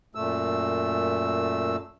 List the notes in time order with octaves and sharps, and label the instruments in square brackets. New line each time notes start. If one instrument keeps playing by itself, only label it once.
[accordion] F#2 A#2 A3 E6